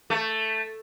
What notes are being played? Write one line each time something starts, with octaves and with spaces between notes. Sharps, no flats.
A3